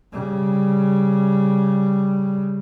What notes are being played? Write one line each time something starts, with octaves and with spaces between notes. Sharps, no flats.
C#3 G3